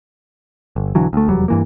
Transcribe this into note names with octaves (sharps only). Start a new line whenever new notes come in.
G1
B1 D3 E3 F#3
D2 A3
F1 E2 F#3 G3
G2 E3 A#3